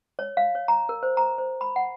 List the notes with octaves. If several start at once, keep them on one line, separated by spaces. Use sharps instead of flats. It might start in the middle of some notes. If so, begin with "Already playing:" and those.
C#5
F5
C#5
A#5
A#4
C5
A#5
C5
B5
F#5